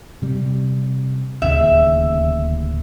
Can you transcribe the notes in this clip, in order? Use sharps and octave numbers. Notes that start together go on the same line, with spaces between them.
C3 G3
D1 D#2 C#3 E5